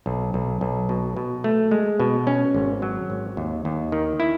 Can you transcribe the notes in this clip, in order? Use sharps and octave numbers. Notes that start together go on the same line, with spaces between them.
B1
B1
B1
B2
B2
A3
G#3
B2
C#4
G#1
F#3
G#1
D#2
D#2
D#3
E4